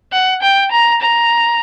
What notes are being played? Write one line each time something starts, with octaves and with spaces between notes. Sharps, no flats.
F#5
G5
A#5
A#5